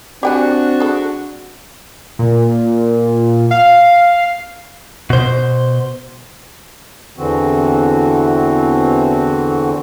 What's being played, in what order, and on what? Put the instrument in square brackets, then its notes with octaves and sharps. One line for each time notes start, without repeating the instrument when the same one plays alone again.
[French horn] C4 [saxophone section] D4 F#4 [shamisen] G4 G5 G#5 [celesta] D5 F#6
[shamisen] G#4 A4
[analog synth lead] A#2
F5
[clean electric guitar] B2 C5
[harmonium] E2 D3 E3 C4 F#4